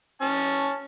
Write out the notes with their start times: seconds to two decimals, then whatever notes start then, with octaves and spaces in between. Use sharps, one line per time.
0.21 C#4 A5